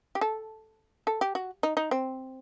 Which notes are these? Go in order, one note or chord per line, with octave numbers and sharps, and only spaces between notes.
G4
A4
A4
G4
F#4
D#4
D#4
C4